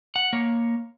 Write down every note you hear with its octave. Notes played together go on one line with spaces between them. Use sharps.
F#5
A#3 C#5